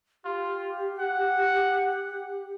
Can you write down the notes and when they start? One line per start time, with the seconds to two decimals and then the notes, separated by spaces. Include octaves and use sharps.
0.25 F4 G4
0.99 F#5